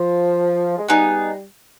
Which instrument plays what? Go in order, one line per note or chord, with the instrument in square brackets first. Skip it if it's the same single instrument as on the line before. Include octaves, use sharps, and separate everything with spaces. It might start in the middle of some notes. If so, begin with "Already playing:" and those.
Already playing: [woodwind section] F3
G#3
[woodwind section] G3 [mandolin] B3 D#4 G#4